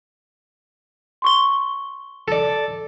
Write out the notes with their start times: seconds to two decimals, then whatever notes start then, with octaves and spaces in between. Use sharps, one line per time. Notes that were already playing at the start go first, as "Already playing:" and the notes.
1.22 C6 C#6 G7
2.28 A4 D5